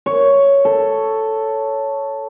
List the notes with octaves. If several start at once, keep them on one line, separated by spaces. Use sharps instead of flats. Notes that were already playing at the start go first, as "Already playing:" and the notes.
C#5
A4